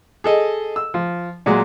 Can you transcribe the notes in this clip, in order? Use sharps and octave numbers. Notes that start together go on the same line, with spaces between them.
G#4 A4 D#5
E6
F3
A#2 F#3 G#3